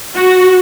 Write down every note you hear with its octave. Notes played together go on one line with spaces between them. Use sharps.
F#4